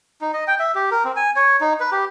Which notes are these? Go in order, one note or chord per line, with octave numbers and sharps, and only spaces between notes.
D#4
D#5
G5
E5
G4
A#4
C4
G#5
C#5
D#4
B4
G4